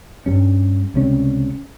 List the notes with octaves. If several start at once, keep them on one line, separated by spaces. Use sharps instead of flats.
G2 G3 C#4
C#2 C3 G3 C#4